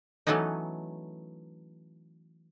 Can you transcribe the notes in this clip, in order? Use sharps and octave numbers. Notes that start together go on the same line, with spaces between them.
E3 F#3 A3 B3 C#4 D#4